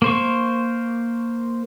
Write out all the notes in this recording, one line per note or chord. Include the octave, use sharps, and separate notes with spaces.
A#3 C5 C#6